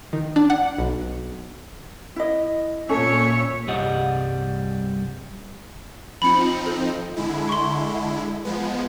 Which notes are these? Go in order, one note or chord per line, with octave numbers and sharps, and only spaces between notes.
D#3
D4
F#5
B1
E4 D#5
A#2 C#4 A4 C#5 E5
C2 G2 G3 G#4 D#5 F#5
F3 C4 D#4 B5 C#7
A4
D3 G#3 E4
C6 C#6
F3 G#3 B3